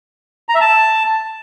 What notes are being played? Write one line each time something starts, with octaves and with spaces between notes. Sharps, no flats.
A#5
E5
A5